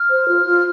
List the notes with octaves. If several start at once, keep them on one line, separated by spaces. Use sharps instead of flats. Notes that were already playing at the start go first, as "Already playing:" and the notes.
Already playing: F6
C5
F4
F4